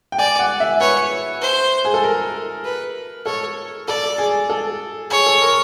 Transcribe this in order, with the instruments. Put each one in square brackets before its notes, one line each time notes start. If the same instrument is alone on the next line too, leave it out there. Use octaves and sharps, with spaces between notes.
[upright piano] G5
[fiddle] D5 [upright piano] G#5
[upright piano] F#5
E5
[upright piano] B4 [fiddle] C#5
[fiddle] C5
[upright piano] G#4
A4
A#4
[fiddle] B4
[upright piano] A4 [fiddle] C#5
[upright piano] A4 [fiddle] D5
[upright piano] G#4
A4
[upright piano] G#4 [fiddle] C#5
[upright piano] A4
A#4